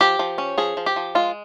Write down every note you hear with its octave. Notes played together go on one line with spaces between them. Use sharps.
F3 G4
F3
C#4
F3 G#4
F3
G4
F3
G#3 F4